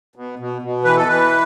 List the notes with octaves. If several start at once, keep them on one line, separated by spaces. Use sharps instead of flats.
B2
B2
B2
E3 B4
A4
E3 B4